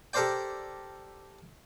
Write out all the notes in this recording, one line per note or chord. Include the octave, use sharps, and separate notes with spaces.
G4 A4 A#4 C5 D5 G5